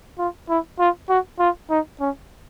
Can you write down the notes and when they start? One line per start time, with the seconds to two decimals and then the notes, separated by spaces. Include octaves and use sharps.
0.18 F4
0.49 E4
0.80 F4
1.09 F#4
1.40 F4
1.70 D#4
2.01 C#4